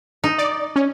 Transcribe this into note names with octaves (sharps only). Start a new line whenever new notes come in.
D#4
D5
C#4